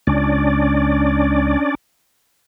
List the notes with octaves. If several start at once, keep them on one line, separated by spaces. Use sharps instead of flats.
C#2 C#4 D4 D5